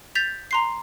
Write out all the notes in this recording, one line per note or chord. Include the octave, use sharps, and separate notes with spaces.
G6 A6 B6 F7
A#5 C6 C7